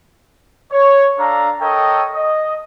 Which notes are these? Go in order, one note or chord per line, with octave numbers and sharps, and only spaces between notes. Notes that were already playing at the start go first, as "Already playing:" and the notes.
C#5
D4 A4 F5 A#5
A4 A#4 C#5 D#5 G5
D#5